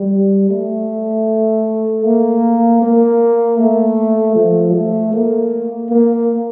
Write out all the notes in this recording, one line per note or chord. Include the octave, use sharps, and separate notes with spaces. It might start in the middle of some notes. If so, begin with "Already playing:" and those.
Already playing: G3
A3
A#3
A#3
A3
F3
A3
A#3
A#3